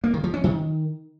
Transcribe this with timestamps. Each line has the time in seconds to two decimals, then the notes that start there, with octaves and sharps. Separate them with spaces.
0.04 A#3
0.14 D#3
0.24 F3
0.34 C#4
0.44 D#3